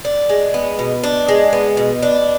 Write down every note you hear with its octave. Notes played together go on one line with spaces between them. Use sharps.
D4
G#3
B3
B2
D4
G#3
B3
B2
D4